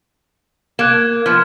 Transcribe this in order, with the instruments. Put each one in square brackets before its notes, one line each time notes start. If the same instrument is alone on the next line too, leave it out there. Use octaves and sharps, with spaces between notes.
[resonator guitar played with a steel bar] A#3 [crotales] F#6 G#6 E7
[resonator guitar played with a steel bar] F3 B3 [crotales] F6